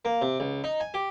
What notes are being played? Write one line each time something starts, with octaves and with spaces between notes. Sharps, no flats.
A#3
C3
C#2
D#4
G#5
G4